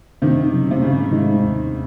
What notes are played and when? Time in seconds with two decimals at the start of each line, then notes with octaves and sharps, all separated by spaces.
0.22 F#2 C3 D#3
0.52 C#3 F#3 C#4
0.71 C3
0.82 G#2 C#3
1.13 D#3 G#3 D#4
1.42 D#2